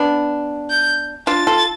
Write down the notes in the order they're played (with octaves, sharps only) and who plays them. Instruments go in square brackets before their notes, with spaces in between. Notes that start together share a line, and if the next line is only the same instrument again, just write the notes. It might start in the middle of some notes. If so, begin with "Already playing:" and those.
Already playing: [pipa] B3 D4
[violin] G6
[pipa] D4 F4 [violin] A6
[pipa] F4 A4